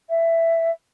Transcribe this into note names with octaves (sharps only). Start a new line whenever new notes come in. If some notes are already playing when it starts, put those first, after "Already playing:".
E5